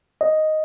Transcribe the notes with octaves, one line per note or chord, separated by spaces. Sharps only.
D#5